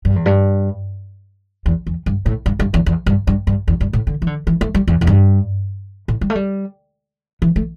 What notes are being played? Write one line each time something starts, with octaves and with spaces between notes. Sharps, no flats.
G2
E2
G2
E2
E2
G2
A2
G2
G2
E2
E2
G2
G2
G2
E2
G2
A2
D3
E3
D3
E3
A3
G3
E2
E2
G2
A2
G3
A3
G3
E3
A3